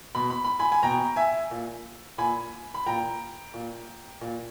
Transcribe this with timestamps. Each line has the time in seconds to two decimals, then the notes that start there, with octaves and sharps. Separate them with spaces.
0.15 B2 B5
0.30 B5
0.45 B5
0.59 G#5 B5
0.72 G#5
0.83 B2 G5 A#5
1.16 E5 G#5
1.51 A#2
2.18 A#2 G#5 B5
2.74 B5
2.86 A#2 G5 A#5
3.54 A#2
4.21 A#2